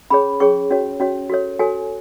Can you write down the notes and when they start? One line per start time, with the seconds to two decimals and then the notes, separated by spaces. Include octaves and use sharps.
0.10 C#4 G#4 C#5 B5
0.40 C#4 G#4 C#5 C#6
0.70 C#4 F#4 C#5
1.00 C#4 F#4 C#5
1.30 F#4 A4 C#5
1.59 F#4 A4 C#5 G#5